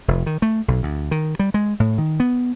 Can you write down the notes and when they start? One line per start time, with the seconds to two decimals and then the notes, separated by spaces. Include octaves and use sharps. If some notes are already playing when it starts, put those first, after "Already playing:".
0.08 F1
0.26 D#3
0.42 A3
0.68 B1
0.83 D2
1.11 D#3
1.39 G3
1.54 G#3
1.80 A2
1.98 D#3
2.20 B3